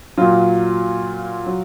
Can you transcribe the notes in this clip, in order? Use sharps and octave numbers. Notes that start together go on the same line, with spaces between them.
A#2 F#3 F4
F#3